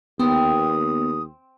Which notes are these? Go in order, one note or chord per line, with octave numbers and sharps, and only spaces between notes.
D#2 B3 C4 D#6